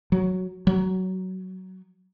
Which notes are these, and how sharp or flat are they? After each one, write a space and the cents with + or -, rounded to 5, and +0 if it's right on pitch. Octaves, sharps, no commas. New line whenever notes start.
F#3 +0
F#3 +15